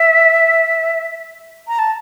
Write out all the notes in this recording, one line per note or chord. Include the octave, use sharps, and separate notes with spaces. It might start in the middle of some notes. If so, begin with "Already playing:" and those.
Already playing: E5
A#5
A5